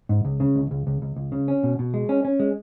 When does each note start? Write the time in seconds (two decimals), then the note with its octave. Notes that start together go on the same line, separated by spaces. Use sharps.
0.09 G#2
0.25 C#2
0.40 C#3
0.56 C#2
0.71 C#2
0.87 C#2
1.02 C#2
1.16 C#2
1.32 C#3
1.48 C#4
1.63 B2
1.79 B2
1.94 G#3
2.09 C#4
2.25 C#4
2.40 G#3